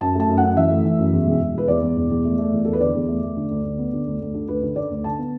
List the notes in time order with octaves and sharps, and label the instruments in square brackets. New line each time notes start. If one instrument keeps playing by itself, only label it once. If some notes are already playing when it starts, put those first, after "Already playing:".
[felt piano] F#2 A5
A3 A5
F#2
F#5
F#2
E3 E5
A3
E3
F#2
E2
E1
E1
E2 B4
E2 D5
E2
E1
E2
A3
A3
E2
E2 A4
B4
D3 D5
E2
A3
A3
D3
D2
D2
B3
D3
D2
D2
D3
D2 B4
D3
D3 D5
D2
D3 A5
B3